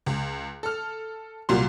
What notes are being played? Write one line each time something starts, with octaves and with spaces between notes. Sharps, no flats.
C#2
A4 F6
C2 A#2 F#3 G3 F4 C6